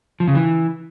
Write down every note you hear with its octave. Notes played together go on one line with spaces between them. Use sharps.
F3
C#3
E3